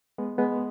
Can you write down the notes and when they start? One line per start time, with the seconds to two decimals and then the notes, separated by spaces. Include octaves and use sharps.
0.18 G#3 B3
0.38 G#3 B3